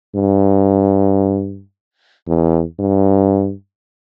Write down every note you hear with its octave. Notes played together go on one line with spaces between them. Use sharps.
G2
E2
G2